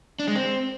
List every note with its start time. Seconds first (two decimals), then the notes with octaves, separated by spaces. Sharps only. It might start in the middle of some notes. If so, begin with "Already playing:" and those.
0.19 D4
0.28 G#3
0.36 C4